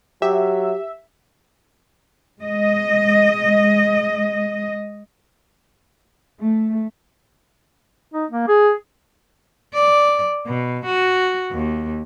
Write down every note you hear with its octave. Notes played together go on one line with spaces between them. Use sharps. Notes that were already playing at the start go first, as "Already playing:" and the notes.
F#3 G4 E5
G#3 D#5
A3
D#4
A#3
G#4
D5
B2
F#4
D#2